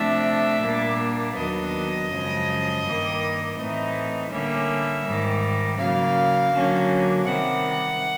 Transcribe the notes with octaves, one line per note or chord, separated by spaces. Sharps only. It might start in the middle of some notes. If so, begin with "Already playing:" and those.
Already playing: C3 F3 A3 D4 E5
A#2 G3 A#3 D4
D#2 D#3 F#3 B3 D4 D#5
F#2 C#3 F3 G#3
G2 D#3 G3 A#3
A2 E3 A3 C4 D#4
D3 G3 A#3 C#4 E5
G#2 D#3 G3
C#3 F#3 A#3 F5
D3 F#3 A#3 C#4
C3 D#3 G3 F#5